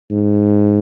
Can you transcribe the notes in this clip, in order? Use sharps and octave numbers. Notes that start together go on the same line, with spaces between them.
G#2